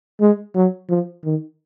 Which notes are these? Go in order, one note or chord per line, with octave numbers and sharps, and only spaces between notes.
G#3
F#3
F3
D#3